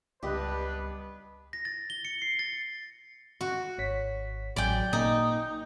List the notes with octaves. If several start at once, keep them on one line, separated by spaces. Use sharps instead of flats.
C#2 G2 B3 D4 G4 B4 D#5
A#6
A6
G7
C#7
C7
A6
F#4
G#1 C#5 B6
A1 F#3 D5 G5 G#5
A#2 A#3 D#4